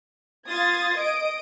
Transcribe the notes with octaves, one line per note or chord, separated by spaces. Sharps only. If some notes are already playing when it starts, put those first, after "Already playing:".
F4 D#6 G#6 A6
D#5 D#6 D7